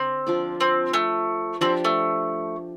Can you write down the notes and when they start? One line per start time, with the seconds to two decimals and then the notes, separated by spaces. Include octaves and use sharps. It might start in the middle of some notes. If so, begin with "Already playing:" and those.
Already playing: D3 C4
0.27 F3 D4 F4 D5
0.61 C4
0.93 A3
1.61 F3 C4 D4 G4
1.84 A3